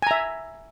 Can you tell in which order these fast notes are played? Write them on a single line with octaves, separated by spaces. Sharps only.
G#5 A#5 E5